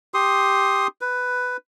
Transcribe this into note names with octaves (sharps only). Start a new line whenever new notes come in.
G4 C6 D#6
B4